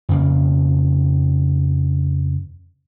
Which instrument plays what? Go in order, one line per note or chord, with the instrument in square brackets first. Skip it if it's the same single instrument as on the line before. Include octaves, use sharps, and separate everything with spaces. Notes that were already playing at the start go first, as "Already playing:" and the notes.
[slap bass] F2 C#3 A#3